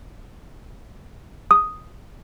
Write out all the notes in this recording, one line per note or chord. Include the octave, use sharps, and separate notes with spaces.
D#6